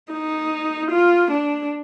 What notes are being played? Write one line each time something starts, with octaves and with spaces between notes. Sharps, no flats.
D#4
F4
D4